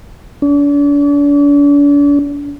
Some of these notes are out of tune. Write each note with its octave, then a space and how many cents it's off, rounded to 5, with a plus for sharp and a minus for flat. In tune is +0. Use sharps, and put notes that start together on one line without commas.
D4 -40